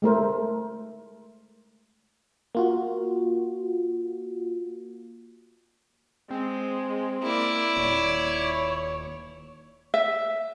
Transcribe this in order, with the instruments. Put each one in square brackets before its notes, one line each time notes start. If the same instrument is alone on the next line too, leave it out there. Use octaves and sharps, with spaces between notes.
[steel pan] G#3 A3 A#4 C5
[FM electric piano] A#3 F4 F#4
[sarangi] G#3 [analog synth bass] C4
[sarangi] A#3 [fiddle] E4 D5
[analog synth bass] D#1 [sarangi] C#5
[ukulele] E5